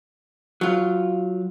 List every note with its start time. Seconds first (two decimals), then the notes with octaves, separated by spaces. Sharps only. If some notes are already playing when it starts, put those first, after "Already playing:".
0.61 F#3 F4